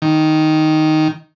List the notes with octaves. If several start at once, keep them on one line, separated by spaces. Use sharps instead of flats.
D#3